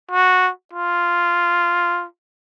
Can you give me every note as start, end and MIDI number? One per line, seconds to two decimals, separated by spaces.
0.11 0.50 66
0.73 2.05 65